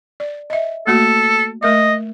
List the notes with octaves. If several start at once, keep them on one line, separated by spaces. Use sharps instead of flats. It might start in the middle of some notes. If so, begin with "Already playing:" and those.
D5
D#5 E5
A3 A#3 F#4 A4
A3 A#4 D#5 E5